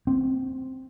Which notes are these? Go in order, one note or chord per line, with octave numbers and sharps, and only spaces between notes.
C4